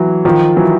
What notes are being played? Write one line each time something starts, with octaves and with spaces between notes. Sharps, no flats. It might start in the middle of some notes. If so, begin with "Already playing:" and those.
Already playing: E3 F#3
D#3 F3
E3 F#3